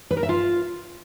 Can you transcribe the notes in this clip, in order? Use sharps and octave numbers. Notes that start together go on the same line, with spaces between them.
B4
A#4
E5
F4